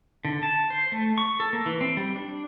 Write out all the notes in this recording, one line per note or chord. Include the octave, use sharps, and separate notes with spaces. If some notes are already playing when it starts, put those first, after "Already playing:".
D3
A5
C5
A3
C#6
A4
A#3
E3
C4
G3
D4